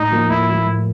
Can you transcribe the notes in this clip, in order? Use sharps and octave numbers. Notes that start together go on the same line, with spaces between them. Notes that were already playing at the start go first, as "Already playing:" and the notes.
Already playing: A2 D#4
F3 A#3
A2 E4
F3 A#3
A2